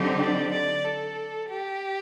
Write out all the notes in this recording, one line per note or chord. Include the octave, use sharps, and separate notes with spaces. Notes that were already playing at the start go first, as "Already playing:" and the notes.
Already playing: D3 F#3 C4 D#4 G4
D5
D5
A4
G4